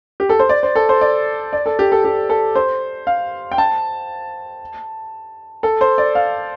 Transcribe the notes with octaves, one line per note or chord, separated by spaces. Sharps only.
G4
A4
C5
D5
C5
A4
C5
D5
D5
A4
G4
A4
G4
A4
C5
F5
G5
A5
A4
C5
D5
F5